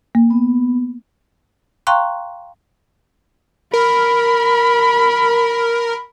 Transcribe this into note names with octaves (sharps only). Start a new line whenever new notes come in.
A#3
B3
F5 G5 A#5 C6 C#6 F#6
A#4 B5